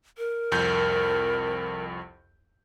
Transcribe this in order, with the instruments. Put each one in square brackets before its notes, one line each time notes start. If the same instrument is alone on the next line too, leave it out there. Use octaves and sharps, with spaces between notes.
[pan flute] A#4
[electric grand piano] C2 F2 G6